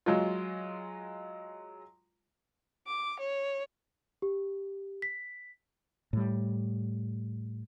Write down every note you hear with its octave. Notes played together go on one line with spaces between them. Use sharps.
F#3 G#3 F4
D6
C#5
G4
B6
A2 G3